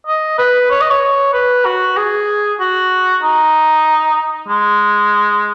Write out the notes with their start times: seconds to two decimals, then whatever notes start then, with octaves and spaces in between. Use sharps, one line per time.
0.07 D#5
0.38 B4
0.71 C#5
0.81 D#5
0.91 C#5
1.33 B4
1.65 F#4
1.97 G#4
2.60 F#4
3.22 D#4
4.48 G#3